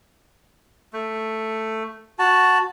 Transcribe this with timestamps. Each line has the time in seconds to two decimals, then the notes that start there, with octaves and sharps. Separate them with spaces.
0.93 A3
2.19 F#4 A5